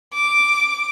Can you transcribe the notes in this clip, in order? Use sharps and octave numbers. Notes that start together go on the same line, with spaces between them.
D6